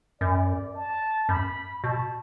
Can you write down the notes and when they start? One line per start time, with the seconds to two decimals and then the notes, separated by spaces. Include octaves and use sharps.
0.20 F#2 D5
0.75 A5
1.29 F#2 B5
1.83 B2 A5